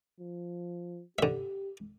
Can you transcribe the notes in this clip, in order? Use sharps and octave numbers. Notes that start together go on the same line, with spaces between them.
F3
D3 G4 E5